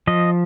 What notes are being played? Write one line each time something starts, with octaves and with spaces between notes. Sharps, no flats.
F3 D#5